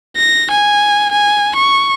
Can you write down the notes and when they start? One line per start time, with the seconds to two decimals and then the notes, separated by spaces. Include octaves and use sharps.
0.17 A#6
0.50 G#5
1.11 G#5
1.56 C#6